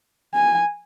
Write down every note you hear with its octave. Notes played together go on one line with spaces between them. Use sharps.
G#5